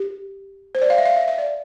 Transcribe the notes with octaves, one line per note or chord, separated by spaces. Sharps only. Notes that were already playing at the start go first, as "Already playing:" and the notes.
Already playing: G4
C5
D5
F5
E5
F5
E5
E5
D5